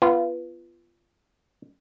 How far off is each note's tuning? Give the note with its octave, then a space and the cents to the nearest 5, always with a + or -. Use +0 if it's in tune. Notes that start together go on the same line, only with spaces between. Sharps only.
B3 +0 F4 -25